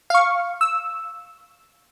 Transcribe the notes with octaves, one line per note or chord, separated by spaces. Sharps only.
F5 C#6
E6